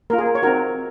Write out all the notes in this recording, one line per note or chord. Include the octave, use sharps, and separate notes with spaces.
A#3 F4 A#4
G#4
A#4
C#5
C4 D#4 F#4 A#4